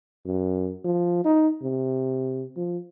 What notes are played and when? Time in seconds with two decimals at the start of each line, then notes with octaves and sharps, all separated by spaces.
0.25 F#2
0.85 F3
1.25 D#4
1.63 C3
2.56 F3